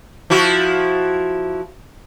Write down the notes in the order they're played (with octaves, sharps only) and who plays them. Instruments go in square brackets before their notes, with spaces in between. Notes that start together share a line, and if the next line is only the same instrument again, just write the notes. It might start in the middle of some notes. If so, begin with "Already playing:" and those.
[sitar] F3 E4 F#4